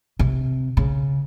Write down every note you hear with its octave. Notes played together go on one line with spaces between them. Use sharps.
C3
C#3